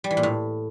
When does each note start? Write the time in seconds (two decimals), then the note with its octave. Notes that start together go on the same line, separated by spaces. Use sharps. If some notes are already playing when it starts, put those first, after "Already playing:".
0.04 G3
0.11 E3
0.17 A#2
0.23 A2